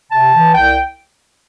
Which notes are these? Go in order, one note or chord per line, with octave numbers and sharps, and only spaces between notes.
C3 A5
E3
C2 G5